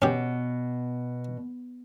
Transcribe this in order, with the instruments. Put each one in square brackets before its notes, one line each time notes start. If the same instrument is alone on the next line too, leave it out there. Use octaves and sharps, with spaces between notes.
[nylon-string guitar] B2 [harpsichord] C#4 G4